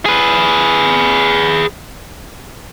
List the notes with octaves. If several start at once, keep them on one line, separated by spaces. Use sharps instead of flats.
G#4 B4